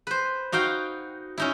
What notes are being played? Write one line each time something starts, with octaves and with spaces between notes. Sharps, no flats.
B4 C5
D#4 F#4 F5 G5
C#4 D#4 E4